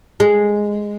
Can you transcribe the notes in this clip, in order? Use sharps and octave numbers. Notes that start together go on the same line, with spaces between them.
G#3